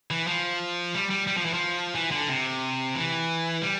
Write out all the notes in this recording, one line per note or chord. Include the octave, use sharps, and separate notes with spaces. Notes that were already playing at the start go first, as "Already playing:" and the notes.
E3
F3
G3
G3
G3
F3
E3
F3
E3
D3
C3
E3
G3